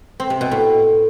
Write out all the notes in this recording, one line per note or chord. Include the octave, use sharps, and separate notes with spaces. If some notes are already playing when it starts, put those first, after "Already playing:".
C4
C3
B2
A2